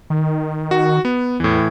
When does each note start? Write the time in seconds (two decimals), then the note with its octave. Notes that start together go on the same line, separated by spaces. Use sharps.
0.10 D#3
0.71 F#4
1.05 B3
1.40 E2 A2 E3